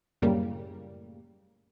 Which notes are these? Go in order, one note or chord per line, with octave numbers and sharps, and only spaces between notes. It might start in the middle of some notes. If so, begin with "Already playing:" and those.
F#2 A2 C#3 G3 A#3